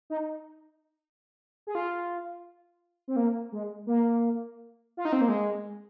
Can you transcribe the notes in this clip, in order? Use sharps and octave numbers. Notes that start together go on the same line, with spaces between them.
D#4
G#4
F4
C4
A#3
G#3
A#3
F4
D#4
C4
A#3
G#3